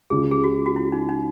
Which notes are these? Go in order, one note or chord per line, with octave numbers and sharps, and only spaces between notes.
C#2 C#3 G#3 G#4
G#4
F#4
F#4
E4
D#4
D#4